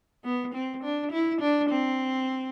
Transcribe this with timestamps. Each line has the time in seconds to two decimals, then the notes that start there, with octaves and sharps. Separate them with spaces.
0.24 B3
0.54 C4
0.83 D4
1.12 E4
1.41 D4
1.70 C4